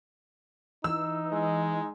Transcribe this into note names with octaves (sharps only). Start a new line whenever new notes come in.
E3 D#4 E6
G#3